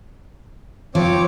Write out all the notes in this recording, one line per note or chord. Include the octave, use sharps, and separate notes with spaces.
F3 C4 C#5 D6